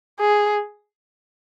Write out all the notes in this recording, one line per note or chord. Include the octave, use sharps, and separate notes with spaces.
G#4